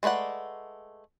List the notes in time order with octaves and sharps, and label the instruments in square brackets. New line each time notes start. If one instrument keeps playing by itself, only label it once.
[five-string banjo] G#3 A3 B4 D5 F#5